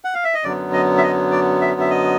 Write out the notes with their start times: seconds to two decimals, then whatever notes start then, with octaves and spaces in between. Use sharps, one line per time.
0.04 F#5
0.14 F5
0.24 E5
0.34 D#5
0.44 F#2 D3 F#3 B3 D5
0.73 D#5
0.98 E5
1.03 D#5
1.31 D5
1.61 E5
1.80 E5
1.90 D#5